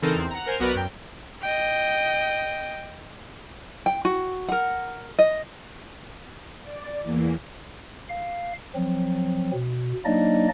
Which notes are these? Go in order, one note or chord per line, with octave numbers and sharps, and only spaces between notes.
C#3 E3 C4 D#4 A4 A#4
E2 C4
F#5 A#5
A#4 C5 G#5 G#6
B1 B3 F#4 A#4 B4 D5
F#2 G5
D#5 G5
G5
F#4
A#4 F#5
D#5
D5
E2 E3 A#3
F5
F3 F#3 C4
B2
F#3 A#3 D4 D#4 D5 D#5